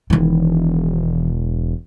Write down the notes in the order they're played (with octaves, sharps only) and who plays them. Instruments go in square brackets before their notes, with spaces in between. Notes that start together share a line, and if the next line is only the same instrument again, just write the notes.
[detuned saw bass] E1 [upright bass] D#3 E3